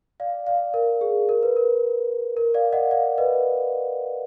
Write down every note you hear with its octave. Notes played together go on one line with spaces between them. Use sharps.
D5 F5
D5 F5
A#4
G#4
A#4
B4
A#4
A#4
D5 F5
D#5 F#5
D5 F5
B4 D#5